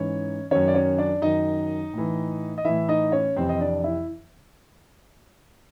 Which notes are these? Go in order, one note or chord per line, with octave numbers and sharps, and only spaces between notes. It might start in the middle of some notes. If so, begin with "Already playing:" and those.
Already playing: G#2 E3 C#4 C#5
F#2 D#3 C#4 C#5
D5
C#4 C#5
D4 D5
F#2 D#3 D#4 D#5
A2 E3
D#5
A2 E3 E4 E5
D#4 D#5
C#4 C#5
F2 C3 E3 C4 C5
D#5
D4 D5
E4 E5